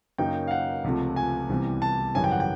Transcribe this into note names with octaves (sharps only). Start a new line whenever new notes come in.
F#2 C#3 F#3 A#3 D#4 G5
F5
F#5
C#2 C3 F3 A3
G#5
C2 C3 E3 G3 B3
A5
G#1 F#2 C#3 E3 G3 G#5
G5
F#5
G5